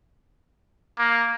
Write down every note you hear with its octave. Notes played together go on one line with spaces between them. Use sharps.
A#3